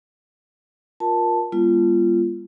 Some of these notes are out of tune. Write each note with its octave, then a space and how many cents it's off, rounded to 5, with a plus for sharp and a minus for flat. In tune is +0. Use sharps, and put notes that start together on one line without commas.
F4 +20 A#4 +15 A5 +0
G3 +35 B3 -35 F4 -25